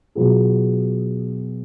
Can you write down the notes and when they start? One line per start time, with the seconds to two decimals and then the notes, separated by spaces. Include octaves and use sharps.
0.15 B2 F#3 B3 F4 G#4